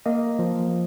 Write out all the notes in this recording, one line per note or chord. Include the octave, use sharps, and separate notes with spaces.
A#3 D#5
F3